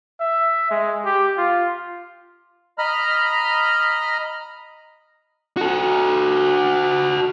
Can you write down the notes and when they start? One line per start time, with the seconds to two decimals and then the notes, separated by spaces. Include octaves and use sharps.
0.20 E5
0.71 G#3
1.05 G4
1.37 F4
2.78 D#5 A#5 B5 F6
5.57 F#4 A4